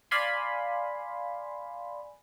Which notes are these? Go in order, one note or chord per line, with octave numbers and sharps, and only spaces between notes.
D5 F5 G#5 B5 C6